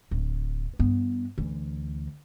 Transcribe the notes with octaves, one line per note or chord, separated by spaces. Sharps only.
D1
G2 B3
D2 E3